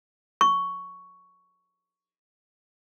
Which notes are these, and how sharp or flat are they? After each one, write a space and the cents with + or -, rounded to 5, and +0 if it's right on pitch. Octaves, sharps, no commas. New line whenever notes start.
C#6 +10